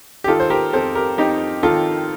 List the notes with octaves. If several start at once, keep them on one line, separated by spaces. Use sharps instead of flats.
G4
D#3 F4 A4
C5
G4 A#4
F2 A4 C5
G4 A#4
F2 D#4 G4
D#3 F4 A4